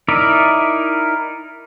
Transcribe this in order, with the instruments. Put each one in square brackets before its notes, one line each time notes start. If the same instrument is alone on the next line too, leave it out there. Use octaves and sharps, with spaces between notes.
[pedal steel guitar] D#4 E4 A#4 D5 E5